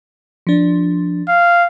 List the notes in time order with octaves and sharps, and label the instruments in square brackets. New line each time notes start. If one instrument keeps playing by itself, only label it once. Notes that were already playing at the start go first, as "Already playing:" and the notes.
[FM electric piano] F3 D4
[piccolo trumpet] F5